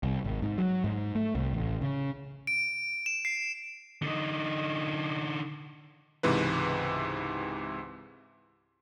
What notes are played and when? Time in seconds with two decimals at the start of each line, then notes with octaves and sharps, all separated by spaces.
0.03 C2
0.24 G#1
0.42 G#2
0.58 F#3
0.84 G#2
1.15 A3
1.35 C2
1.53 A1
1.81 C#3
2.47 D7
3.06 E7
3.25 C7
4.02 D3 D#4
6.23 C#2 G#2 C3 E3 B4